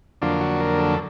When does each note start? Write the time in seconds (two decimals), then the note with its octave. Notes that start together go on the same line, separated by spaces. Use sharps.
0.22 F2 D3 F#3 A#3 D4 F4
0.41 F#4
0.60 A#4
0.79 A4